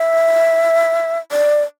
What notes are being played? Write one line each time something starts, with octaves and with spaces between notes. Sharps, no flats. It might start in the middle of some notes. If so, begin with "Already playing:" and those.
Already playing: E5
D5